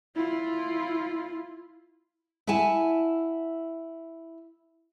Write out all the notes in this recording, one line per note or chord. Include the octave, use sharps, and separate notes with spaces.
E4 F4
E4 E5 F#5 G#5 A5